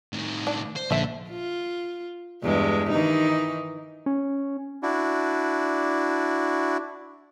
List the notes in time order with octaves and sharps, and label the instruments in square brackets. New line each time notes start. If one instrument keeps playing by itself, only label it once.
[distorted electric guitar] A2 D#3
[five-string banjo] D4
[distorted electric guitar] C5
[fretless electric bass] A#1 [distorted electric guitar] D3 [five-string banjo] A3 C5 E5
[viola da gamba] F4
E2 G2 G#3
D#3 E3 D#4
[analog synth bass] C#4
[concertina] D4 E4 F#4